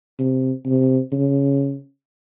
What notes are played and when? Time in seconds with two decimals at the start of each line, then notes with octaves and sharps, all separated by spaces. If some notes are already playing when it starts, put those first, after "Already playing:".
0.19 C3
0.66 C3
1.12 C#3